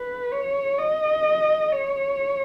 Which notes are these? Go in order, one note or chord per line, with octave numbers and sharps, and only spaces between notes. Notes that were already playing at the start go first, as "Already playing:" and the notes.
Already playing: B4
C#5
D#5
C#5